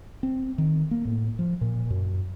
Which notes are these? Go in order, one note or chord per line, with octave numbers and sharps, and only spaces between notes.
C4
D#3
A#3
A2
F3
A#2
F#2